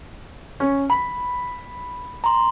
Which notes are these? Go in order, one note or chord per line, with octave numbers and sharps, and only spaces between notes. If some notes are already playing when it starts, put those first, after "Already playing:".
C#4
B5
A#5 C6